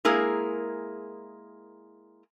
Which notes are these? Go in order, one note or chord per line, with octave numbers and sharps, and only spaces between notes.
G#3 A#3 E4 G#4 A#4